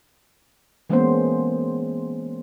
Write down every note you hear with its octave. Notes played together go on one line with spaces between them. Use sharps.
E3 G#3 A#3 B3 C#4 C5